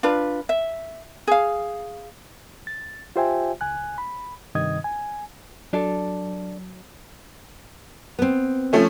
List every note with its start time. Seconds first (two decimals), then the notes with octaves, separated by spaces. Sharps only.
0.03 D4 F4 B4
0.49 E5
1.27 G#4 F5
2.67 A6
3.16 F4 G4 C5 E5 G5 G#5
3.61 C#2 G#5 F#6
3.98 B5
4.55 G2 C3 D#3 D#5 D#6 G#6
4.84 G#5
5.73 F#3 D4 A4
8.19 B3 C4
8.73 F3 A3 C#4